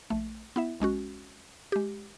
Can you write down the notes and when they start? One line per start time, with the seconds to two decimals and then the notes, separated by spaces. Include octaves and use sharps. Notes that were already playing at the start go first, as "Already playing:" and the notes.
0.10 A#1 A3
0.56 B3 E4 E5
0.80 B1 G#3 C#4 F#4
1.72 G#3 G4